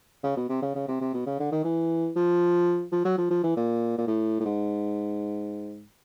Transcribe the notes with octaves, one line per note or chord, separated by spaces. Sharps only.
C#3
B2
C3
C#3
C#3
C3
C3
B2
C#3
D3
D#3
E3
F3
F3
F#3
F3
F3
E3
A#2
A#2
A2
A2
G#2